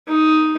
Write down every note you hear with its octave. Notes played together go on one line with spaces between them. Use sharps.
D#4